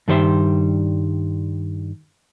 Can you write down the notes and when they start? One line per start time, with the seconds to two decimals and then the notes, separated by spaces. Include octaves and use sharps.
0.08 G2 D#3 G3 C5 E5 C6